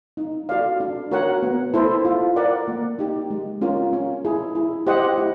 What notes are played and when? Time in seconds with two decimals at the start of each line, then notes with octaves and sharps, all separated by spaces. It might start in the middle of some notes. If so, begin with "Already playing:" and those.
0.17 D#4
0.49 F#4 A4 D5 F5
0.80 D4
1.11 F#4 A#4 C#5 F#5
1.43 B3
1.74 E4 A4 C5
2.05 F4
2.36 A#4 D5 F#5
2.68 A#3
2.99 D#4 G4
3.30 G#3
3.61 C#4 F4 A#4
3.93 C#4
4.25 E4 G#4
4.55 E4
4.87 G4 C5 D#5 F#5
5.18 E4